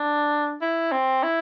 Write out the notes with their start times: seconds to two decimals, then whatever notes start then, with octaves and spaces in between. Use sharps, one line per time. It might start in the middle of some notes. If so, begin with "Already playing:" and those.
Already playing: D4
0.62 E4
0.92 C4
1.23 E4